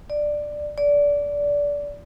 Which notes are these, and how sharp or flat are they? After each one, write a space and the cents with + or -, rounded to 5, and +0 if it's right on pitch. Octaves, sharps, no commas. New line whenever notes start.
D5 +10
D5 -20